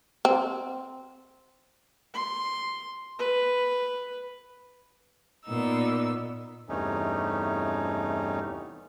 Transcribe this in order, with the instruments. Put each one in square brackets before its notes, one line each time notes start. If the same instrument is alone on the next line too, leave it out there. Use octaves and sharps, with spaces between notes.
[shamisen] C4
[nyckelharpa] C6
B4
[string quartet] A#2 B3 D#4 E6
[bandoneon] E2 G2 C3 A3 C#4 D#4